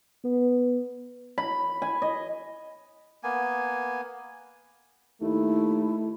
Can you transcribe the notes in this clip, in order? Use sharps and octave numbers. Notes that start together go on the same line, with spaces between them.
B3
B5
G#5
D#5
A#3 B3 G#5
D#2 A3 E4